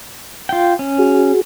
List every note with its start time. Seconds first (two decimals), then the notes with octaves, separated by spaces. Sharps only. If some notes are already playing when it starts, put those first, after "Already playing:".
0.49 F4 G5
0.79 C#4
0.98 F#4 G#4